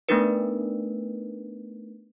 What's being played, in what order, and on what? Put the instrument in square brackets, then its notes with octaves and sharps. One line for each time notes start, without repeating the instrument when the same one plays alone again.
[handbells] A3 B3 D4 D#4 A#4 B4